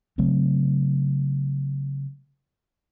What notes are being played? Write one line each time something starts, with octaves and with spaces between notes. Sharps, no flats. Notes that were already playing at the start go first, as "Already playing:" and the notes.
C#3 F#3 A3 C4